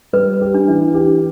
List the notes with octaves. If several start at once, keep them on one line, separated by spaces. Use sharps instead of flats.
G3 B4
G4
D4
E3
G4